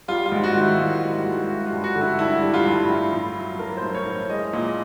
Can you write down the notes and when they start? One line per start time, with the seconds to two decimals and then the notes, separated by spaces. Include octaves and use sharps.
0.08 G3 F4
0.26 F4
0.32 G#2
0.43 F#4
0.55 D#3
0.61 E4
0.79 G#2 F4
1.02 G3
1.14 F#4
1.26 G#2
1.48 G3 F#4
1.66 F4
1.72 G2
1.84 F#4
1.95 D3
2.01 E4
2.19 G2 E4
2.43 G3
2.54 F4
2.66 G2
2.89 A2
3.13 A2
3.36 F#3
3.59 F#3 A#4
3.77 C5
3.83 A2
3.95 C#5
4.06 A2
4.29 G#3 D#5
4.53 A#2